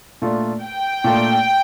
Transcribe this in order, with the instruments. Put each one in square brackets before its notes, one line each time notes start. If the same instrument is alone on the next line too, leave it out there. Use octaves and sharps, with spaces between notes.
[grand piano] A#2 A3 D4 F4
[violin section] G5
[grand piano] A#2 A3 D4 F4